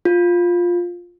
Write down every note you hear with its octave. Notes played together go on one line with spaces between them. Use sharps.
F4